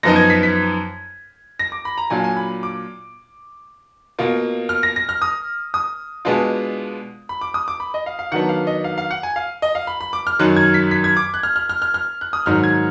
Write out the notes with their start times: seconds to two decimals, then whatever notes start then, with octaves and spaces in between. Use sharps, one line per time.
0.03 F#2 F3 B3 D#4 A#6
0.16 G#6
0.30 B6
0.43 B6
1.59 A#6
1.72 D6
1.85 B5
1.98 A#5
2.10 A#2 F#3 D4 F4 G#5
2.24 G#5
2.37 B5
2.63 D6
4.19 B2 A#3 F4
4.69 F6
4.83 A#6
4.96 A#6
5.09 F6
5.22 D#6
5.74 D#6
6.25 B2 G#3 B3 D4 F4
7.29 B5
7.41 D6
7.54 D#6
7.68 D6
7.80 B5
7.94 D#5
8.06 F5
8.19 F5
8.32 D#3 F#3 B3 D4 F#5
8.49 F5
8.67 D#5
8.84 F5
8.98 F5
9.11 F#5
9.23 G#5
9.36 F5
9.62 D#5
9.75 F5
9.87 B5
10.01 B5
10.13 D6
10.27 F6
10.39 F#2 D#3 F#3 F#6
10.56 G#6
10.74 B6
10.91 B6
11.04 G#6
11.17 D6
11.34 F#6
11.43 F6
11.56 F6
11.69 F6
11.82 F6
11.94 F6
12.21 F#6
12.33 D#6
12.46 G#2 D#3 F#3 F6
12.64 G#6